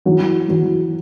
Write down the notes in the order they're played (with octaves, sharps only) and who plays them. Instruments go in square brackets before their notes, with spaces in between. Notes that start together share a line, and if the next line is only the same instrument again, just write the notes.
[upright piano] E3 F#3 F#4
E3 F#3 F#4